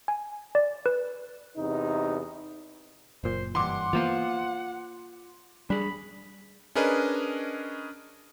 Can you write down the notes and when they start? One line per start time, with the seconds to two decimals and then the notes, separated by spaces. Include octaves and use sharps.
0.08 G#5
0.55 D5
0.86 B4
1.57 E2 C3 D#4
3.24 F#1 A#2 C5
3.55 G2 E3 F#5 C6 D6
3.93 E3 A#3 B3 F4 C5 F5
5.70 G3 D4 G#4 B5
6.75 C#4 D4 G#4 A#4 B4 D#5